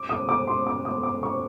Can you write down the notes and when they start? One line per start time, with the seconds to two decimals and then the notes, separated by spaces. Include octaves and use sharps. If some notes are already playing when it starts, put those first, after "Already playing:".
Already playing: D6
0.09 D#6
0.29 D6
0.47 C6
0.67 D6
0.85 D#6
1.03 D6
1.23 C#6